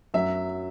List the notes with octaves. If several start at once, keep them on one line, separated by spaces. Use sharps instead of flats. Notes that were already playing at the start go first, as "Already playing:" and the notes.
F#2 F#3 E5